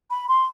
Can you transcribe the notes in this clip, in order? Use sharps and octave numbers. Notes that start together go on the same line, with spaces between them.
B5
C6